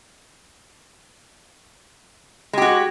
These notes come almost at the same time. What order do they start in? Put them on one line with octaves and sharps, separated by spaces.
G#3 G4 F#4